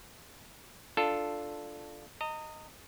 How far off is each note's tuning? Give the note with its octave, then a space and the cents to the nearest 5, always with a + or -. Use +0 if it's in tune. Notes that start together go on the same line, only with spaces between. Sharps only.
D4 +5 F4 +0 A4 +0
D#5 +0 A#5 -30